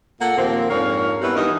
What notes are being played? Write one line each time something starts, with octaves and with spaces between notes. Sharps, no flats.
A#2 A#3 A4 F#5
D#2 A#2 F3 A#3 C4
F2 G#2 D4 A#4 C#5 F5
G3 B3 C#4 E4 F#4 B4
G2 E3 B3 D#4 A#4 D#5